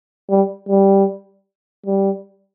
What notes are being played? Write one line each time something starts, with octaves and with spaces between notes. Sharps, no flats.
G3
G3
G3